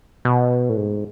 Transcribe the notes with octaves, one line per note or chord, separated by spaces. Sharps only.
B2
A2
G#2